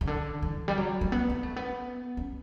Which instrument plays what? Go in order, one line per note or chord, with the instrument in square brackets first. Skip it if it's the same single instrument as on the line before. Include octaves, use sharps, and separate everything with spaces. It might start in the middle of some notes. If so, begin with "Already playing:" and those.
[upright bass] C#3
D3
E3
G3
F#3
A3
B3
B3
A3
B3
C#4